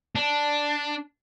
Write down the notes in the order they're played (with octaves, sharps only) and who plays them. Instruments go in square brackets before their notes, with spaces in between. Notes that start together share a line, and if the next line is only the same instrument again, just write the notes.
[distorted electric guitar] D4